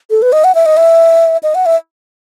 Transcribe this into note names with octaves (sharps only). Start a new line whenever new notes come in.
A4
B4
D#5
F#5
E5
D#5
E5
D#5
F#5
E5